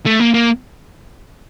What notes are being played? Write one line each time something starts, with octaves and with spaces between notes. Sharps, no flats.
A3
A#3
A#3